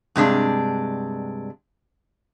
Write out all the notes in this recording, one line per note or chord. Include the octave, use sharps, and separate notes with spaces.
G2 C3 G#3 D4